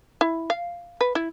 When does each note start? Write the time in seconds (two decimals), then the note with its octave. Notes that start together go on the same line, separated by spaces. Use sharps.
0.21 E4
0.50 F5
1.01 B4
1.15 E4